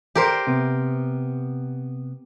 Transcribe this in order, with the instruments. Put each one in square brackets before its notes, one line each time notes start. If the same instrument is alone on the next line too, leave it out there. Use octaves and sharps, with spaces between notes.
[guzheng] G4 A#4 C5
[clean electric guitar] C3 B3